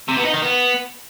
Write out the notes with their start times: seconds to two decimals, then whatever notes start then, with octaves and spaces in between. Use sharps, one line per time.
0.08 C3
0.17 B3
0.25 D#4
0.33 D#3
0.42 B3